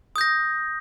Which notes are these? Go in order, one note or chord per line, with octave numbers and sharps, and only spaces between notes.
D#6 G6 A#6